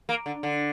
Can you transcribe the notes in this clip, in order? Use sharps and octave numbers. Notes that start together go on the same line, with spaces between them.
A#3
D3
D3